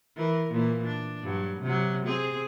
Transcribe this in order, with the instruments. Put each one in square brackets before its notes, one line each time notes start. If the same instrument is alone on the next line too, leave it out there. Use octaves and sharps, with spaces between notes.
[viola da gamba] E3 A#4
A#2 E3 A#3
D4
G2 F#3
C3 F#3
C4 G#4